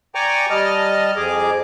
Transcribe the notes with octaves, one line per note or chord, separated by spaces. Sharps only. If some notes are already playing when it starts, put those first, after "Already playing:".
D5 G5 G#5 A#5 C#6 D6
G3 D#5 A5 F6
F2 G#4 D6